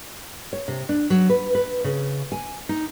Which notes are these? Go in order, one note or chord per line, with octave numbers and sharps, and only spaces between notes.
C#5
C3
D4
F#3
B4
B4
C#3
G#5
D#4